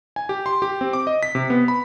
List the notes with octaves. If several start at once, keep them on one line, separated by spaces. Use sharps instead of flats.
G#5
G4
C6
G4
C4
D6
D#5
B6
C3
B3
B5